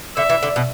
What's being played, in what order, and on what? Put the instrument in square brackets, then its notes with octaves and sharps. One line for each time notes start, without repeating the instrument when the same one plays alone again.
[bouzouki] D3 [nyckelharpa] E5
[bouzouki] E3
D3
B2